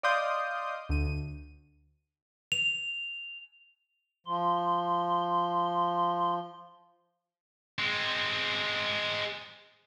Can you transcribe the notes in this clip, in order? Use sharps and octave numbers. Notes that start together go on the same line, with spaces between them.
D5 D#5 F5 C6 D#6 G6
D2 D#7
F7
F3 C6
G#3 C4